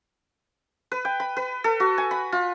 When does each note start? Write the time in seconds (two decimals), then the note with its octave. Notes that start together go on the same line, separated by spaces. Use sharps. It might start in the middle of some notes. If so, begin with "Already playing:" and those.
0.92 B4
1.05 G5
1.20 B5
1.37 B4
1.64 A4
1.80 F#4
1.98 G#5
2.11 B5
2.32 F4